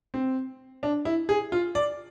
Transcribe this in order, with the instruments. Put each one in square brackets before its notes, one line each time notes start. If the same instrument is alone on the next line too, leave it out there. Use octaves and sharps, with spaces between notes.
[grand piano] C4
D4
E4
G#4
F4
D5